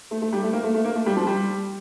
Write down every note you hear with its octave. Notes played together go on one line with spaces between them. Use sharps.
A3
A3
G3
A3
A#3
A3
A3
A#3
A3
G3
F3
G3